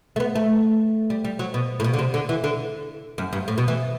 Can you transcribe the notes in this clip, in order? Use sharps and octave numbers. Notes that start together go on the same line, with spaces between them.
A3
B3
A3
G3
G3
F#3
B2
A2
B2
D3
C3
D3
E3
D3
F#2
G2
A2
B2
E3